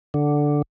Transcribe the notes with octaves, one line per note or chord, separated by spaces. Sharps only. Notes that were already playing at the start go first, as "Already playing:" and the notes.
D3